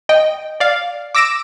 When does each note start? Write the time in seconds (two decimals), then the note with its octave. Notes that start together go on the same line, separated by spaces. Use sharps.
0.09 D#5 G5
0.60 D5 F5
1.15 D6 E6 A#6 D7 E7